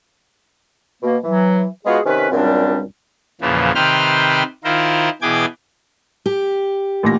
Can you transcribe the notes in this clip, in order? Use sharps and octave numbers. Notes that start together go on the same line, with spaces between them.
B2 A#3
E3 F#3
G#3 B3 F4 F#4 G#4
C3 D#3 C#4 B4
C#2 F#2 A#2 G3 C4 D4
E2 A#2 C#3 E3 F3
C3 D#3 B4 C5 G5 F6
D#3 E4 F4 A#4 C5
B2 E3 G#4 G5 D6 G#6
G4
A1 A#2 A#6